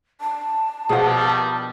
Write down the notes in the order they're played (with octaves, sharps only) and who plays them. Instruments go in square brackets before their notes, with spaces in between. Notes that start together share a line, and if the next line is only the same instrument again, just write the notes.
[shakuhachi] A5
[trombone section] G2 D#3 G3 [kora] B2 F3 [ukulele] G#4 F#5